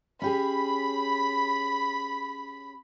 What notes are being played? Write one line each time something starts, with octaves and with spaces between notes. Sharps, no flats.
C#4 G4 G#4 B5